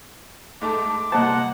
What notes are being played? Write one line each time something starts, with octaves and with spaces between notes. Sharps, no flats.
G#2 A3 A5 D6
C2 A#3 C5 D#5 F#5 A5